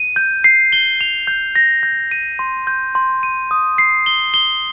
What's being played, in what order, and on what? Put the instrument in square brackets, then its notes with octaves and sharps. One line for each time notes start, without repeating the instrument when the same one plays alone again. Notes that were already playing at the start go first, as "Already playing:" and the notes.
Already playing: [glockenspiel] D#7
G6
C7
G7
F7
G6
A#6
G6
D#7
C6
G6
C6
D#7
D#6
C7
G7
G7